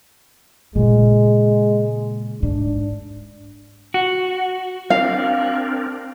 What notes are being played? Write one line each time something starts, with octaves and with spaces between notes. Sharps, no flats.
A#2 C#3 G#3
G#2 D4
F#4
C4 D4 A#4 F5